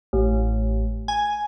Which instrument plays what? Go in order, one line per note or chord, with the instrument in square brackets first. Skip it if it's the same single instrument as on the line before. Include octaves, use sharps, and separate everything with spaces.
[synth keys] A1
G#5